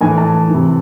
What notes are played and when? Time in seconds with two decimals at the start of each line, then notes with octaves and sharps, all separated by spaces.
0.01 A2 E3 G#5
0.18 A5
0.50 C3 E3